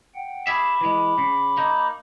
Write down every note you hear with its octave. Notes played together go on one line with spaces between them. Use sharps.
F#5 G5
G#4 E5 B5 D6
E3 G#3
C#3
A#3 D#4